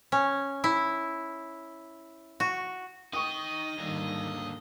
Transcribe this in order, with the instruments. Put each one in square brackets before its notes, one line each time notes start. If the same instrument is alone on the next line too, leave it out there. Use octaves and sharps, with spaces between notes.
[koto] C#4
E4
F#4
[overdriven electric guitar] D#4 G5 [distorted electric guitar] D#5 [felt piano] C#6 D#6
[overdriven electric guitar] D#2 D3 [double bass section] G#2 D#3 G3